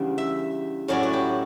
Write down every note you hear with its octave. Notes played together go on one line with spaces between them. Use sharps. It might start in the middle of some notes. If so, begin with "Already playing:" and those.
Already playing: E2 C#3 G3 D4 F#5
E5
A2 F#3 C#4 E4 D5
F#4
G4